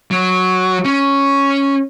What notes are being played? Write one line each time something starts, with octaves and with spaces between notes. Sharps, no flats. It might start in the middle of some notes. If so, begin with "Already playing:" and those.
F#3
C#4